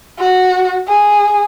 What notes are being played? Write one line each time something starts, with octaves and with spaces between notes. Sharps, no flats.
F#4
G#4